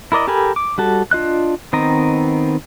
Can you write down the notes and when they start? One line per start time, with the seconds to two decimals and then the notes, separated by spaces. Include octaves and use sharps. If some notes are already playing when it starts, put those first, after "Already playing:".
0.12 E4 A#4 D5 D#5
0.27 G4 A4 A#4 G#5 B5
0.56 D6
0.78 G3 F#4 A4
1.11 D4 F4 D#5 F#6
1.73 D#3 B3 C4 D#5 A#5